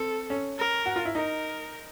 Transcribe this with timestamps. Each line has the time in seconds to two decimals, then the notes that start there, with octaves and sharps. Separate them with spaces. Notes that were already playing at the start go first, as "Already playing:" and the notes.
Already playing: C4 A4
0.30 C#4
0.59 A#4
0.86 F#4
0.96 F4
1.05 E4
1.15 D#4 A#4